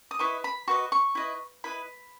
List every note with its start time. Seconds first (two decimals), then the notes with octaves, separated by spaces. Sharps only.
0.11 D#6
0.19 E4 B4 D#5 C#6
0.44 B5
0.68 F#4 B4 D#5 C#6
0.92 C#6
1.15 E4 B4 D#5
1.64 E4 B4 D#5 B5